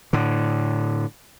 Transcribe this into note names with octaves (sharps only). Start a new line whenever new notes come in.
A2 D3